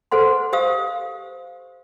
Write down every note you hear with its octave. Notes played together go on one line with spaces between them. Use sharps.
A4 B4 C5 F#5 C6
G4 C5 F5 D#6